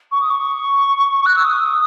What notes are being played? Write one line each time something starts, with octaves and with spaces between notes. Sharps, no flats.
C#6
D#6
C#6
F#6
E6
D#6